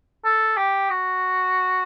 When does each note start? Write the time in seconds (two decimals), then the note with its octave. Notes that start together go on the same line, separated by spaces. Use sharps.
0.25 A4
0.57 G4
0.90 F#4